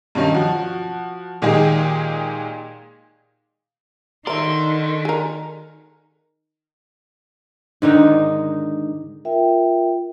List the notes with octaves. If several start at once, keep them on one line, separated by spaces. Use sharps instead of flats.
G2 B2 D#3 C#4 D#4
F3 F#4
A#2 D#3 G#3 D#4 G4 G#4
D#3 A4 A#4 D5 E5 C6
G#4 A#4
G#2 D3 D#3 D#4
F4 A#4 E5 G5